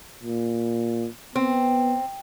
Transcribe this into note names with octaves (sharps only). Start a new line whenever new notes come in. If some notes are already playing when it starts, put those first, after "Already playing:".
A#2
B3 C4